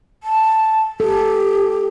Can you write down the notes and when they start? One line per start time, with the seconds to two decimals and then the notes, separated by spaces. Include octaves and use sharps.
0.23 A5
1.00 G4 A4